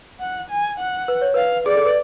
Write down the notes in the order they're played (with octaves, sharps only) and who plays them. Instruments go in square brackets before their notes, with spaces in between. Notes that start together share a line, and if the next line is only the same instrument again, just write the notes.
[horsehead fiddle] F#5
G#5
F#5
[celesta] B4
C#5
[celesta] B4 [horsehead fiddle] F5
[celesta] G#4 [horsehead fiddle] D5
[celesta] A4
B4